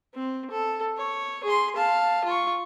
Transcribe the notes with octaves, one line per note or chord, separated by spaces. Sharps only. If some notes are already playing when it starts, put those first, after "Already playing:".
C4
A4
C#5
G#4 C6
F5 A5
F4 C#6